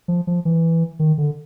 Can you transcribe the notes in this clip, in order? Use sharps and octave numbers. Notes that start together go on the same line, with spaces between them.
F3
F3
E3
D#3
D3